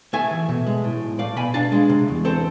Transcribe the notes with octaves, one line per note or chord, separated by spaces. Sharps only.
A3 E5 G#5
E3
B2
G#3
A2
B1
A3 D5 F5
B2 G#5 B5
D4 F5 A5
G#3
C3
E2
C4 A4 C5